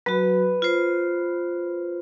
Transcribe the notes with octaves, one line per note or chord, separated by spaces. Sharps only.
F#3 F#4 B4
F4 C5